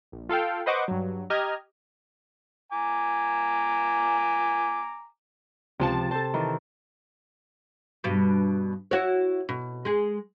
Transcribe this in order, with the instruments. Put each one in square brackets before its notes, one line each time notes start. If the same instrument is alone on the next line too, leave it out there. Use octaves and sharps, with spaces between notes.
[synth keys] A#1
F4 A4 F5 G5
B4 C5 D#5 F#5 C#6 D6
G2 F#3
G4 D#5 A#5 F6 G#6
[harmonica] G#5 A#5 D6
[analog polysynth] C#2 F3 A5 [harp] C3
[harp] A4 C5 [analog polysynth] A5
[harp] D#3 E3
[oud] G2 B2
E4 F#4 C#5
B2
G#3 G#4